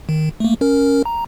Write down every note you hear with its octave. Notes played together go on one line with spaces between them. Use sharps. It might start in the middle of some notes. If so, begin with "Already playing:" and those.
D#3
A3 A#3
C#4 A#4
A#5